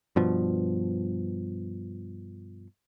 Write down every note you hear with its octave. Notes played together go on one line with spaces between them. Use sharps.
G2 B2 F3